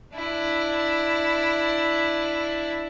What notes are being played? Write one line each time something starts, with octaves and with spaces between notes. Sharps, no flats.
D4 E4